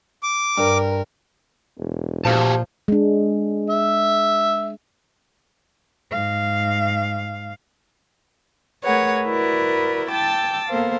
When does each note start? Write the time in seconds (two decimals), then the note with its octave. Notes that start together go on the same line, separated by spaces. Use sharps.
0.23 D6
0.58 G2 A#4
1.78 E1
2.25 A#2 F3 F#4 G4 A5
2.88 G#3 D4
3.70 E5
6.11 G#2 F5
8.83 A3 G#4 A#4 B4 C#5 F#5
9.26 E4 F#4 A#4 B4 D5
10.10 G5 A5 D6 E6 A6
10.69 A#3 B3 A4 A#4 C5 F5